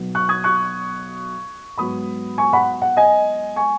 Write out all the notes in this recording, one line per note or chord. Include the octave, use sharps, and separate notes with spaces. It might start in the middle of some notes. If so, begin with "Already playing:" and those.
Already playing: B1 B2 F#3 B3
C#6 F#6
D#6 G#6
C#6 F#6
G#2 F#3 B3 B5 D#6
G#5 C#6
F#5 B5
F#5
D#5 G#5
G#5 C#6